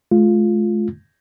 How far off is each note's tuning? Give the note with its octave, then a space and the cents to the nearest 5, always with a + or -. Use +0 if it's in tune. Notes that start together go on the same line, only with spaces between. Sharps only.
G#3 +45 F4 +0